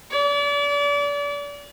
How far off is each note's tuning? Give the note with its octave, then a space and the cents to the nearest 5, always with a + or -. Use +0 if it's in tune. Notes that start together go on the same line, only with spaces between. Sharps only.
D5 -35